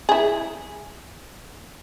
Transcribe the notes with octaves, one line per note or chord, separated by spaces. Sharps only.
E4 G#4